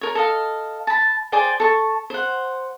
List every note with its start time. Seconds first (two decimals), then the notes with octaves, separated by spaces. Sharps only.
0.01 A#4 C#5
0.15 A4 D#5 F5
0.87 A5 B5
1.32 G#4 C5 D5 G5
1.60 A4 C#6
2.10 C5 F#5